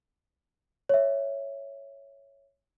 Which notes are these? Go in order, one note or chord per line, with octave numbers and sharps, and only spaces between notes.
C#5 E5